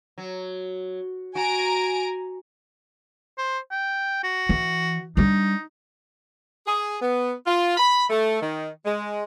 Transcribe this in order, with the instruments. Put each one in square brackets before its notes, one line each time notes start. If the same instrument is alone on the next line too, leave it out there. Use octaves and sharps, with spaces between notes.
[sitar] F#3
[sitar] F#4 [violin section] G#5 A#5 D7
[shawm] C5
G5
F#4
[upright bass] E3
[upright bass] G3 D4 [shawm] D#4
[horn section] G#4
B3
F4
B5
A3
D#3
G#3